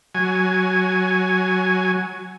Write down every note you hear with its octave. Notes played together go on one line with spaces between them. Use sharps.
F#3 G#5